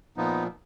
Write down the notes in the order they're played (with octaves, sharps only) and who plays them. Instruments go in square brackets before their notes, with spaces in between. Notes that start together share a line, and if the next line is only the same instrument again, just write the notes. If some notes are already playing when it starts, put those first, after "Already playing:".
[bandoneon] A#2 F3 B3 D#4